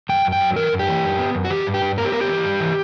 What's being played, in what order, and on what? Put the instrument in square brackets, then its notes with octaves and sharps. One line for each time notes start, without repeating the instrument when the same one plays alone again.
[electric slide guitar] F#2 G5
F#2
G5
F#3
E3 A#4
F#2
G4
E3
F#2
B3
F#2
F#4
E3 G4
G2
G4
G2
B3 A#4
G4
B3 A#4
G4
E3
G2
E3